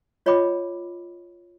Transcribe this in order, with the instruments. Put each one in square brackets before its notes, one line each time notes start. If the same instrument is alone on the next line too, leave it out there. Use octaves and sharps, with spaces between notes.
[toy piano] F4 C#5 D#5 G5 B5 D6